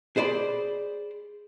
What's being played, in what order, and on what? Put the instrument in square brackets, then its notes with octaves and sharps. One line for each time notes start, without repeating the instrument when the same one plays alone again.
[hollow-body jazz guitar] G#4 C5 D5 B5